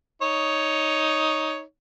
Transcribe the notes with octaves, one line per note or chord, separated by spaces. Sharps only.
D#4 C#5